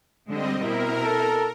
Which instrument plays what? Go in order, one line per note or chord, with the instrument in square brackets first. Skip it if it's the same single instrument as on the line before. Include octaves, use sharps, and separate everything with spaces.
[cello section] D3 G#3 [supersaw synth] G3 C4 D#5
[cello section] B2 C4 E4 [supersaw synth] A#4
[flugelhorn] A4